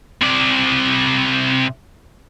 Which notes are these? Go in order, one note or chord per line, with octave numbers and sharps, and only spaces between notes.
C3 D5